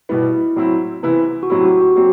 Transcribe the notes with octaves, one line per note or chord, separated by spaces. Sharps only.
B2 G3 B3 E4
A2 F#3 C4 E4
C3 E3 B3 E4
F#4
A2 F#3 C4 E4 G4
F#4
F#4
F#3 C4 G4